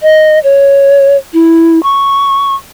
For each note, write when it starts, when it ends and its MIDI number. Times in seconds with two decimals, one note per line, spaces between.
0.03 0.39 75
0.44 1.17 73
1.34 1.81 64
1.83 2.55 85